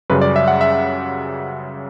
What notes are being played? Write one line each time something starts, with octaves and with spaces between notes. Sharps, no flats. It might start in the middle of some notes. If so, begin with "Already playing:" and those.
F#2 C#3 G3 B4
D5
E5
F#5
E5